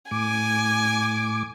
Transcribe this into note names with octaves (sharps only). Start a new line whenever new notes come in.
A2 G#5 D6